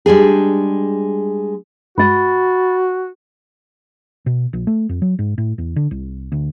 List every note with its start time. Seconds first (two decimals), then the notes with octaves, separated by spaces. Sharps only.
0.06 G3 G#3 D4 G#4
1.98 G2 G#3 F#4 B5 A6
4.26 B2
4.53 A#1
4.67 A3
4.89 F2
5.02 F#3
5.19 G#2
5.38 A2
5.58 E2
5.76 D3
5.91 C2
6.32 D2